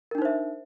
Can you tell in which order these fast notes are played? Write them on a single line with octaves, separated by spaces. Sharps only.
A#4 D4 D#4 C5 E5